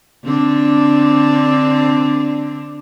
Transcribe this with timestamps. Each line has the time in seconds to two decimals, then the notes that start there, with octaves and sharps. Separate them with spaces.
0.24 D3 C4 D4